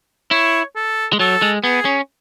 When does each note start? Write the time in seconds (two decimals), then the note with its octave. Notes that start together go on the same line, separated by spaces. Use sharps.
0.31 E4 C#5
0.76 A4
1.13 G#3
1.19 F#3 A4
1.42 G#3
1.63 B3 G#4
1.85 C#4